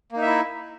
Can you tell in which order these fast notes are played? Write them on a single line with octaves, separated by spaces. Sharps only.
A#3 D#4 E5 E4